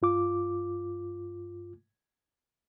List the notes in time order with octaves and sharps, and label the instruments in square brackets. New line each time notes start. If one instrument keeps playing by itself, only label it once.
[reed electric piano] G2 F4 D6